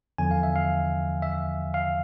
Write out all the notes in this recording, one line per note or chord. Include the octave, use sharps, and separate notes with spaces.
E2 D3 F3 G#5
F5
E5
F5
E5
F5